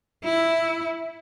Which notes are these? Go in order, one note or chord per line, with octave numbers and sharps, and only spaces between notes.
E4